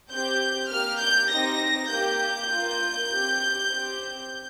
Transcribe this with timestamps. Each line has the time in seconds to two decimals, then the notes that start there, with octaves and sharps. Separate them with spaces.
0.11 C4 G4 G6
0.70 A#3 G4 F6
1.01 G6
1.30 C4 D#4 G4 A#6
1.90 A#3 G4 G6
2.51 A#3 F4
3.11 C4 G4
3.71 C4 G4